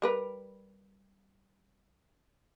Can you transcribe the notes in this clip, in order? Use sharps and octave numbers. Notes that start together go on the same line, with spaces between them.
G3 A#4 B4